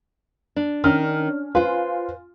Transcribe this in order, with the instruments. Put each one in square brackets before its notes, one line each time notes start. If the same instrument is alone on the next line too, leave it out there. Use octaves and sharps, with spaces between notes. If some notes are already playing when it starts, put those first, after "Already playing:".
[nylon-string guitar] D4
[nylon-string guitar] D#3 [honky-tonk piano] C#4 D4 F6
[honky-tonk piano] F4 G#5 C6 [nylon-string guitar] B4 C5